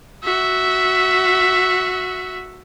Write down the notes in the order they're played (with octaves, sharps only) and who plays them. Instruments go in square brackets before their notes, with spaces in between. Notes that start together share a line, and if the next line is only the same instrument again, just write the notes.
[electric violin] F#4 E5